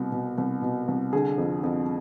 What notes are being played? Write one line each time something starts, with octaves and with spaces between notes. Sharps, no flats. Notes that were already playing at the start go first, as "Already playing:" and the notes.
Already playing: C2 B2
B2
C2
B2
C2
D3 G#4
F2
F2